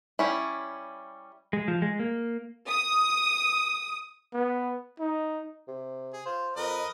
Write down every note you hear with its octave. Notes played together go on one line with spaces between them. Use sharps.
G3 C#4 E4
G#3
F3
G#3
A#3
D#6
B3
D#4
C3
G#4
F4 C5
F2 A#4 B4 D#5